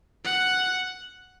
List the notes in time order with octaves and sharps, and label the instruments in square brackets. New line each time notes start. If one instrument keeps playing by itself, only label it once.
[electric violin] F#5